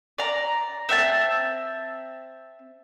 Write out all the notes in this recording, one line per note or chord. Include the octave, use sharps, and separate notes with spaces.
D5 A#5
C4 E5 G5 A5